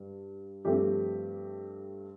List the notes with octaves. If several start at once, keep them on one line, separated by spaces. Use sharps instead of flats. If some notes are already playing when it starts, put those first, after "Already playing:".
Already playing: G2
G2 F3 A3 C4 G4